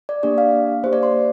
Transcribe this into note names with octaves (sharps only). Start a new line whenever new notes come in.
D5
A#3 D4 G4 D5
F5
A#3 G4 C5
D5
C6